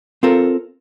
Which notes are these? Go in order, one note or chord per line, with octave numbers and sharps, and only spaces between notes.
C4 F4 A4 A#4